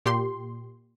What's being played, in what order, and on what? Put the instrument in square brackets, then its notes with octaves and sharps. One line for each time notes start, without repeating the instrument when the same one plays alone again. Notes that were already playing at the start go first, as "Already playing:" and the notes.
[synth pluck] A#2 G4 C6